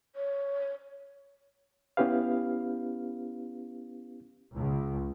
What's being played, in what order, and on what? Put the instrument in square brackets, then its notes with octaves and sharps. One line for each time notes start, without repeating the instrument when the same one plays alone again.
[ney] C#5
[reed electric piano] B3 C#4 E4 G4 B4 F5
[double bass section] C#2